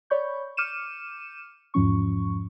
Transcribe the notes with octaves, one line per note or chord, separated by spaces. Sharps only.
C#5 D5 B5 C#6 G6
D6 F6 G6 C#7 D#7 E7
E2 G#2 F3 C#4 C#6